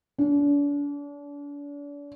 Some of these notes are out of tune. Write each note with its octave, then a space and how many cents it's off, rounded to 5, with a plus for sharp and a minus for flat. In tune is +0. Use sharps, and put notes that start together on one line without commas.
D4 -40